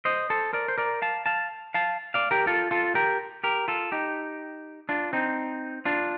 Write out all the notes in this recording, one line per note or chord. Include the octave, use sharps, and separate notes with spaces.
C5 D#5
A4 C5
A#4 D5
C5
A#4 D5
F5 A5
F5 A5
F5 A5
D5 F5
G4 A#4
F4 A4
F4 A4
G4 A#4
G4 A#4
F4 A4
D#4 G4
D4 F4
C4 D#4
D4 F4